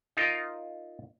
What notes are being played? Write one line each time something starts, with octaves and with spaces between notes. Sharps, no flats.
D#4 F4 A#4 D#5